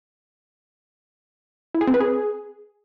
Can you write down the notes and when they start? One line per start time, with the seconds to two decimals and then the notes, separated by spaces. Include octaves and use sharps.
1.74 E4
1.81 G#4
1.87 C4
1.94 B4
2.00 G#4